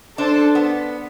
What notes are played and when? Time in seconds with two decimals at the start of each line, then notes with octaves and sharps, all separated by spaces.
0.18 D4 A4 C5
0.55 B3